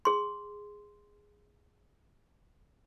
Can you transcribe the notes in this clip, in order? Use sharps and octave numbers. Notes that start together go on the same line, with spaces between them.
G#4 C6